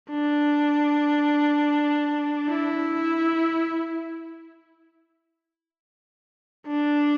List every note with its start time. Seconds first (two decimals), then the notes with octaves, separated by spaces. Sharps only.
0.10 D4
2.49 E4
6.67 D4